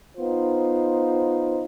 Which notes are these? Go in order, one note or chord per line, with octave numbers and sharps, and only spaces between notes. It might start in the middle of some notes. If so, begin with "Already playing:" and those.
B3 D#4 F4 C5